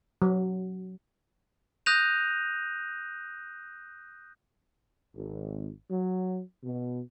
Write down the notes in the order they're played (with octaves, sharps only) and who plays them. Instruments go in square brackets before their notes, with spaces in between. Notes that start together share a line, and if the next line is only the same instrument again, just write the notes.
[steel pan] F#3
[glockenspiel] D#6 F#6 G6 A#6 D#7 F7
[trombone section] G#1
F#3
B2